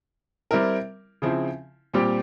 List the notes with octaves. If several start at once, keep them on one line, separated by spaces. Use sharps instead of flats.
G3 C4 E4 A#4
C#3 F3 C4 E4
A#2 G3 C4 G4